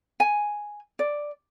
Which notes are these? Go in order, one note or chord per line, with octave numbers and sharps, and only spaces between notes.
G#5
D5